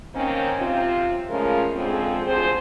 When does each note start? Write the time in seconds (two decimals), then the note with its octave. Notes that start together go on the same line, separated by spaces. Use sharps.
0.14 D#3 A#3 C4 C#4
0.59 C3 C4 F4
1.30 C#3 F3 G#3 A3 C#4 A#4
1.76 F2 D3 F3 G#3 C4 G#4
2.27 D2 C3 F3 G#4 C5